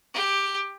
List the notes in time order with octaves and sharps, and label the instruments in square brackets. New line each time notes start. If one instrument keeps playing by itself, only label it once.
[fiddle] G4